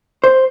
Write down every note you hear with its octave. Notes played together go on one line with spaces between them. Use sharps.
C5